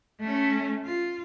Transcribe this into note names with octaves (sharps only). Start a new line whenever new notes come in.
A3 C#4
F4